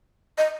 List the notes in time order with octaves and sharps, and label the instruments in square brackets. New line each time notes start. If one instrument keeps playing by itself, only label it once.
[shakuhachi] D#5